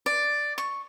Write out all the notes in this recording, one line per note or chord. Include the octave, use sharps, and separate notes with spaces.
D5
C#6